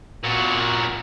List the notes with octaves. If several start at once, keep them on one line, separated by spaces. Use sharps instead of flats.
A#2 F#4